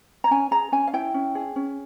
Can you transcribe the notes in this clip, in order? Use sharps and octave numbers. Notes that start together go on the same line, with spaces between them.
A#5
C#4 G#5
G#4 A#5
C#4 G#5
F5
E4 G5
C#4
G#4
C#4